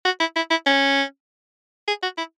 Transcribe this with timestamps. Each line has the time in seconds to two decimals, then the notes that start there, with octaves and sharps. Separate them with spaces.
0.05 F#4
0.20 E4
0.36 E4
0.50 E4
0.66 C#4
1.88 G#4
2.03 F#4
2.18 E4